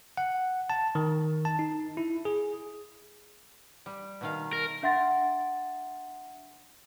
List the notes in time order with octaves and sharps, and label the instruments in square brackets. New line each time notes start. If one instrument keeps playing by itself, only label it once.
[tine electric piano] F#5
A5
D#3
A5
D#4
E4
G#4
[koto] G3
B2 D#3 F5
[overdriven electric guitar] A#4
[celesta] D4 E5 F#5 C6 A6